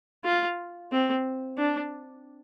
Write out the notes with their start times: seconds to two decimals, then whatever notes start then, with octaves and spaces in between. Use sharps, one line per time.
0.24 F4
0.91 C4
1.58 D4